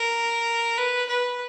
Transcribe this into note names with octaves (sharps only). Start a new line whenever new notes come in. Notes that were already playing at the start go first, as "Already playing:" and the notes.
Already playing: A#4
B4
B4